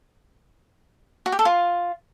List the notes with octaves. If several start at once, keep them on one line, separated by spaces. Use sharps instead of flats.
F#4
G4
A4
F4